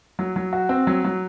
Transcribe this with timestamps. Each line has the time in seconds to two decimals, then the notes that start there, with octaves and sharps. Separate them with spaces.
0.19 F#3
0.36 F#3
0.53 F#4
0.69 C4
0.87 F#3
1.04 F#3